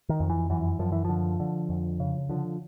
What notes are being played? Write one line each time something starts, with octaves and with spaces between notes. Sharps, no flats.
D#3
F2
E3
F#2 E3
F#2 F3
E3
D3 F3
D3
F2
C#3
D3 F3